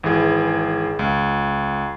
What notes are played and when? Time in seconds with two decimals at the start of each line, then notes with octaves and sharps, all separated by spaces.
0.03 G#1 E3 G#4
0.99 C#2